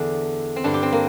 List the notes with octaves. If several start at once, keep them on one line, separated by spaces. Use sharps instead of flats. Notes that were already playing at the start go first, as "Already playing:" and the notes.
Already playing: E2 D3 D4
C4
G2 D3 D4
G4
C4
A#3